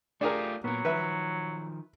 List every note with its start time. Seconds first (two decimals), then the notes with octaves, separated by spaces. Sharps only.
0.21 A3 D4 F4 G4 G#4 A#4
0.64 A#2 F#3 A#3 B3
0.85 D#3 F3 B4 E5